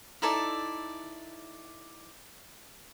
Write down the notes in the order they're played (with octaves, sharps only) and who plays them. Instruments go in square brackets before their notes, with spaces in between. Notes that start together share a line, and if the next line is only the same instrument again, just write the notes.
[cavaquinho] D#4 E4 A4 D5